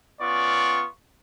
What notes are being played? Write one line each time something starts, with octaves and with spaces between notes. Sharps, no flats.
B3 C#4 F4 D5 C#6